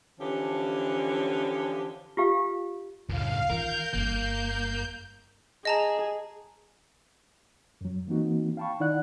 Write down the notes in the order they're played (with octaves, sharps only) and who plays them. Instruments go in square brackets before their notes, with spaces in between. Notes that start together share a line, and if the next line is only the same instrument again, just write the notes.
[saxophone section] D3 E3 F3 C#4 G4
[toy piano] F4 G4 F5
[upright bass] C#2 [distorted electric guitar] F#2 A2 [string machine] F5
[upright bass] D#3 F4 [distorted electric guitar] A#4 [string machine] G6
[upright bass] G1 G2 [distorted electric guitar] A#3
[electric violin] G#4 [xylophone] D#5 A5 A#5
[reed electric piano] F#2 F#3
E3 A#3 C4 D#4 F#4
F5 G5 A5 B5 C#6
D#3 D#4 E4 D5 F#5 F#6